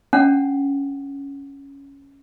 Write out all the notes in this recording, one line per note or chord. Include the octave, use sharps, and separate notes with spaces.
C#4 D4 F#5